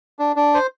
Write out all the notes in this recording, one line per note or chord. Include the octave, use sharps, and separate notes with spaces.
D4
D4
C5